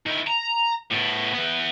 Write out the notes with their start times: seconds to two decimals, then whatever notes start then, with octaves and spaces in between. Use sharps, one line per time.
0.06 D#3 E4
0.27 A#5
0.91 A2 B3
1.34 E3 B3